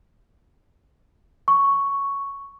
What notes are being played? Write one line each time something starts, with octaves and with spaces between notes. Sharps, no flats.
C#6